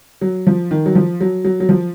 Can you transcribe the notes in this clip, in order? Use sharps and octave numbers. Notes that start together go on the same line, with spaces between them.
F#3
F3
D#3
F#3
F3
F#3
F#3
F#3
F3